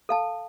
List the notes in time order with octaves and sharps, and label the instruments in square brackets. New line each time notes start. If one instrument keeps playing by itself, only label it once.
[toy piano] A4 F5 A5